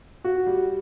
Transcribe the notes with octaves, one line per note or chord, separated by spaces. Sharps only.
F#4
G3